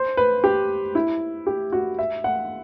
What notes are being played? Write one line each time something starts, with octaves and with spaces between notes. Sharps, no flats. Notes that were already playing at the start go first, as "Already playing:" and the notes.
Already playing: C5
B4
G4
E4
G4
F#4
E5
F#5